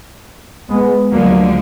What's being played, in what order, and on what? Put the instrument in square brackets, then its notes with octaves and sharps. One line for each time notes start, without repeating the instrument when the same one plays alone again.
[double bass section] G#3 B3
[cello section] D2 D3 F3 G#3 [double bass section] F#3 A#3